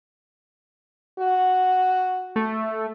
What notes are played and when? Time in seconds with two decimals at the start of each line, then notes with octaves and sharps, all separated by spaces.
1.19 F#4
2.36 A3